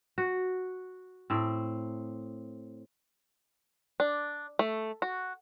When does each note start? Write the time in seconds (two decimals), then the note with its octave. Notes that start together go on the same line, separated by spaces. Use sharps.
0.18 F#4
1.30 A2 C4
4.00 D4
4.59 A3
5.02 F#4